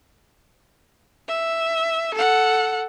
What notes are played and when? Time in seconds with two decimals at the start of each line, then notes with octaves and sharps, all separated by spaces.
1.28 E5
2.14 A4 F#5